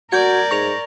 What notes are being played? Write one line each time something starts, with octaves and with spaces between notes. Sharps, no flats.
F#4 A#4 D5 G6 G#6
G#2 C#6 A#6 F7